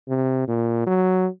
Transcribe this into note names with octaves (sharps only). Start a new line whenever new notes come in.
C3
A#2
F#3